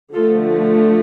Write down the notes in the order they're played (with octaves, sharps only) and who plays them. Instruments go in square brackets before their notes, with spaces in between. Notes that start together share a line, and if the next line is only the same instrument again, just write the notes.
[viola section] D3 F3 A3 F4 A4